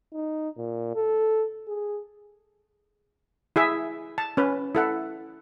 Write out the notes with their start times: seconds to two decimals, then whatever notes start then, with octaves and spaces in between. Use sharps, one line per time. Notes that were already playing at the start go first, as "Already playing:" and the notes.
0.13 D#4
0.57 A#2
0.95 A4
1.67 G#4
3.56 E4 G#4 E5
4.18 A5
4.37 C#4 B4
4.75 E4 A4 F#5